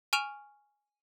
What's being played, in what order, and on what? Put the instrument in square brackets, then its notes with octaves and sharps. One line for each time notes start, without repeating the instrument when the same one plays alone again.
[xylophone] G#5 C#6 F6 D7 E7 F7